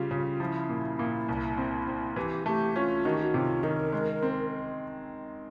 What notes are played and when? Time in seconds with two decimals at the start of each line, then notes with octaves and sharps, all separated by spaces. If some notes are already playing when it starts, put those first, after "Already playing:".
Already playing: C#3 G3 F4
0.11 C#3
0.40 F3 E4
0.69 A#2
0.99 A#2
1.28 C2
1.57 C4
1.87 C4
2.16 E3 G4
2.46 A3 G4
2.75 C#4 F4
3.04 D#3 F#4
3.14 G4
3.22 F#4
3.34 C3 F4
3.63 D#3 A#4
3.93 G#3
4.23 C4